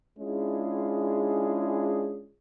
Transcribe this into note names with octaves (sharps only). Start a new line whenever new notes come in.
G#3 C#4 D4 E4 F4 G#4